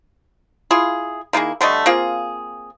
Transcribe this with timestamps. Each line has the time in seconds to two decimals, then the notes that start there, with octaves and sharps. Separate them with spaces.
0.71 E4 F4 G#4
1.33 D#3 A#3 E4 G#4
1.61 D3 G3 A3 D#5
1.86 A#3 C4 F4 G#4